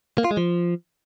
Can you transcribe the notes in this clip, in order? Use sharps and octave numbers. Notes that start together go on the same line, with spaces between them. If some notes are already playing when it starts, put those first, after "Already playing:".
A#3
F4
G#3
F3